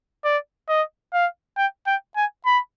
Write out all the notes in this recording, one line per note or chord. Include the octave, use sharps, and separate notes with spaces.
D5
D#5
F5
G5
G5
G#5
B5